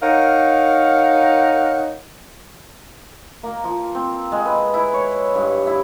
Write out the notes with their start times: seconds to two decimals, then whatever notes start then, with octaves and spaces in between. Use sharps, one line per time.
0.02 D#4 A#4 C#5 F5 F#5
3.43 A#3
3.64 F3
3.95 C4
4.32 G#3
4.46 B4
4.74 E4
4.94 C#5
5.35 G2
5.67 E4